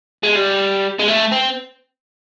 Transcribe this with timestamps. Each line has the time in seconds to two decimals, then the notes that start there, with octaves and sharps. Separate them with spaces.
0.23 G#3
0.36 G3
0.99 G#3
1.08 A3
1.32 C4